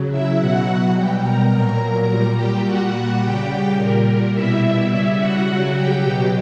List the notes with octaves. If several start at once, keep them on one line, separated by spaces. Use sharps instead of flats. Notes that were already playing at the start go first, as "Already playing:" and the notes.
Already playing: C#3 F#3
E4 E5
B2 F#3 F#4 F#5
B2 G3 G4 G5
A#4 A#5
A#2 F#3
A#2 G3
G4 G5
A#2 G3 F#4 F#5
C#3 G3 G4 G5
A#2 G3 A#4
B2 G3 E4 E5
C#3 G3 E4 E5
F#4 F#5
C#3 F#3
G4 G5
B2 F#3